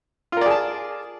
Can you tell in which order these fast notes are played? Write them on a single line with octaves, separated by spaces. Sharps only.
F4 A#4 D5 G#4 A5